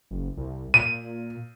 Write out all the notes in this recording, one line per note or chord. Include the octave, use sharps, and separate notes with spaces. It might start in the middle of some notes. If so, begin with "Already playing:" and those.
F#1
C2
A#2 D#7